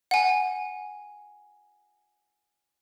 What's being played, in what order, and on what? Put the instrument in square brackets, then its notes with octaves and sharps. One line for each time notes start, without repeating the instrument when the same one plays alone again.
[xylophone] F#5 G#5